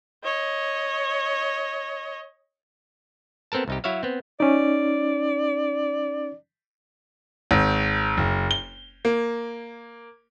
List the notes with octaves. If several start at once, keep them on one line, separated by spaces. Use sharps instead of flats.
C#5 D#5
B3 C4 A4 A#4 A5
C2 D#4 G4
F#3 E4 F#4 C#5 E5 F5
B3 C4
C#4 D#4 D5
G#1
F#1
G7
A#3